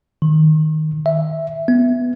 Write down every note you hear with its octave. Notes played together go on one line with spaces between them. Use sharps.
D#3
E5
B3